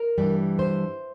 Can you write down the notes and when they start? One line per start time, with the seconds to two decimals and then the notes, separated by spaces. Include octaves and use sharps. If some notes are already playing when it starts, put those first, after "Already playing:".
Already playing: A#4
0.18 G2 E3 G3
0.59 C5